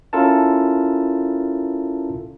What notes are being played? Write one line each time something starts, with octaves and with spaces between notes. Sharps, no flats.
C#4 E4 F4 A4 A#4 A5